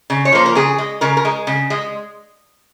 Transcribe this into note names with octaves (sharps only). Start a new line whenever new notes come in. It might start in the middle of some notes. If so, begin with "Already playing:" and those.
C#3
C#5
F3 A#3 C5
A#4
C#3 G#4
G#3
C#3 A#4
A#4
G#3
C#3
G#3